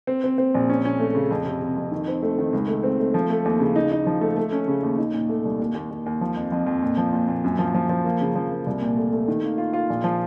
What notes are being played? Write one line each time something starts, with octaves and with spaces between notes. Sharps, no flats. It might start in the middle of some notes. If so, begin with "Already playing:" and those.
C4
C4
C4
A#1
C#4
C#4
A3
C#3
F2
C3
C3
F2
D#3
C4
A3
D#3
C#2
A3
C4
A3
F3
A3
D#2
C#3
D#4
D#4
F3
A3
A3
C#4
C#3
D#2
D#4
A#2
A3
C2
D#2
D#2
D#2
D#2
F3
F2
F2
F2
A#2
F3
A#2
A#2
F#2
F3
F3
F3
A#3
C#3
F3
A#3
C2
A#2
A3
A3
D#3
A#3
F4
F4
A#1
F3